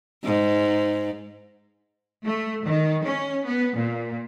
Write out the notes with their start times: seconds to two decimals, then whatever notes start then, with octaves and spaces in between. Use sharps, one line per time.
0.25 G#2
2.24 A3
2.65 D#3
3.04 C#4
3.45 B3
3.76 A#2